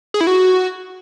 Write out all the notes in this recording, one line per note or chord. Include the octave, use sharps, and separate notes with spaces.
G#4
E4
F#4